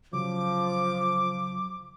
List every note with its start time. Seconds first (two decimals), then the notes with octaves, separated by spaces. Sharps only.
0.13 C#3 F3 F#3 D6